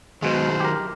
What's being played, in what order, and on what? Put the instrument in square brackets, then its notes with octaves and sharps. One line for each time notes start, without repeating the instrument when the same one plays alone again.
[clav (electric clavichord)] B2 G#3 [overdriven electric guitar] D#3 F#3 [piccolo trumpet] C5
[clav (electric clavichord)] G4 A#4